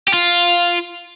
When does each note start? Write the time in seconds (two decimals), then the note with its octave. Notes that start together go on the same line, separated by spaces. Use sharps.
0.08 G4
0.14 F4